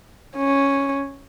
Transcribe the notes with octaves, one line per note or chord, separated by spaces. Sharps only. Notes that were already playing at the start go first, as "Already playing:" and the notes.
C#4